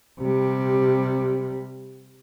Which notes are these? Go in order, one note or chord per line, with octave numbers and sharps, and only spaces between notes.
C3 G3